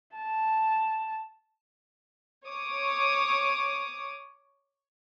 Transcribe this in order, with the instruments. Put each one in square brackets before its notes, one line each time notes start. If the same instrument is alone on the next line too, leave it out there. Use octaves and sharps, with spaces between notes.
[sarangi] A5
[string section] C#5 D6 D#6